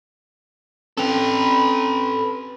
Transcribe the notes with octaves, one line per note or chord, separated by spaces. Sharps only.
C4 C#4 A4 B4 G5